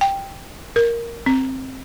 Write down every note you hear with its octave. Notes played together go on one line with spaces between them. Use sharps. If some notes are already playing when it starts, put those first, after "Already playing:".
G5
A#4
C4